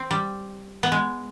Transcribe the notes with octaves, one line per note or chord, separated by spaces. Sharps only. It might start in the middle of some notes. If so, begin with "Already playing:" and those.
Already playing: C4
G3
B3
G#3